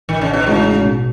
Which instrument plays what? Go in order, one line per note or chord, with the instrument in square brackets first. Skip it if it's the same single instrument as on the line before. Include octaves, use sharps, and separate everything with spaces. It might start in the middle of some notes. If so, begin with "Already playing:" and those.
[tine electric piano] A1 [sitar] D#3
[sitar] C#3
B2
[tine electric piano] A2 G#3 D#4 F#4 [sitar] C#3
[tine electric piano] B2